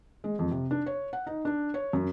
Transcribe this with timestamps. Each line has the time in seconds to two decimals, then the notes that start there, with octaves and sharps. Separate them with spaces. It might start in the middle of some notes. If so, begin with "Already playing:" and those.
0.24 G#3
0.39 F2
0.51 C3
0.71 D4
0.86 C#5
1.13 F#5
1.27 D#4
1.45 D4
1.74 C#5
1.93 F#2